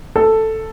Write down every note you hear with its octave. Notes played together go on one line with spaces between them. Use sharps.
A4